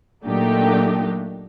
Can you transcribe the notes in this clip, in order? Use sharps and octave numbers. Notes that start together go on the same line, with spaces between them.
A#2 F#3 A3 D4 D#4 G4